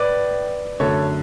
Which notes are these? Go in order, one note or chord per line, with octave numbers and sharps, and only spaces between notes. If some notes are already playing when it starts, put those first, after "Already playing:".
Already playing: A2 B4 D5
F#2 D3 F#3 A3 A4 C#5